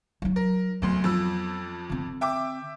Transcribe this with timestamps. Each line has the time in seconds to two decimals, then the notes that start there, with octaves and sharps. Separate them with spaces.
0.22 F#3 D#4
0.36 A#4
0.82 F#1 D2 F#3 B3 C6
1.04 F2 F3 E6
1.89 D3 C4
2.21 E5 G5 D6